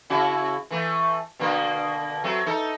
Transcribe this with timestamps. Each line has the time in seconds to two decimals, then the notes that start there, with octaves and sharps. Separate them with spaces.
0.10 C#3 E4 F#4
0.71 E3 A3
1.39 B2 D3 A#3
2.24 F#3 A3 C4
2.46 D#4 A4